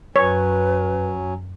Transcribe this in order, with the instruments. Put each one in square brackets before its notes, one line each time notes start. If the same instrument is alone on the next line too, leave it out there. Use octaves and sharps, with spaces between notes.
[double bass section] F#2 [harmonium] F#3 C#4 [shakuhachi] B4 [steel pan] C#5